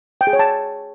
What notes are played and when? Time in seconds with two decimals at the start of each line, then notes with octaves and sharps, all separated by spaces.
0.21 G5
0.27 G#4
0.33 C#5
0.39 A5